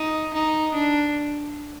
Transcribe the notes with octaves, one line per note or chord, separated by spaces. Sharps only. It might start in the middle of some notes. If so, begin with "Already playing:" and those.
Already playing: D#4
D#4
D4